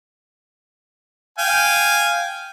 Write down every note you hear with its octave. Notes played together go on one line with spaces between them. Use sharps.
F5 G5 G#5